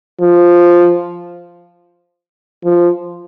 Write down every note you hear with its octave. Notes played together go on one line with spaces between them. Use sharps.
F3
F3